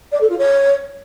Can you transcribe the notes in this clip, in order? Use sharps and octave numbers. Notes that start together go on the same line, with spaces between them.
D5
A4
F4
C#5